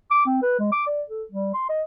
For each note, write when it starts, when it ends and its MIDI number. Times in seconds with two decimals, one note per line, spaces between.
0.11 0.21 86
0.26 0.42 60
0.43 0.58 71
0.59 0.70 56
0.72 0.86 86
0.87 1.02 74
1.09 1.23 69
1.32 1.49 55
1.54 1.65 84
1.69 1.83 75